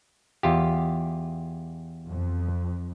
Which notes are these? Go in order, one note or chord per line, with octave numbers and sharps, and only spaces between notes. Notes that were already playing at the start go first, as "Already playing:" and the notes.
E2 F4 G4
F2